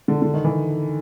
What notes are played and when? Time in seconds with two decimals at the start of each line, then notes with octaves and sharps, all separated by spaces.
0.08 D3
0.22 D3
0.34 D#3
0.45 E3